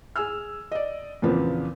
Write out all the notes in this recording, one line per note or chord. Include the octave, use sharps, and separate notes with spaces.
G#4 G#5 E6 F6
D5 D#5
E2 A#2 C#3 F3 B3 C4